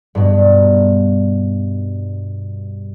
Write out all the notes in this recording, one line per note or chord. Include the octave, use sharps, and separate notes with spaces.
G2 B2